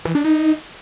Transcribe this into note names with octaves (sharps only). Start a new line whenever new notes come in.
E3
D4
D#4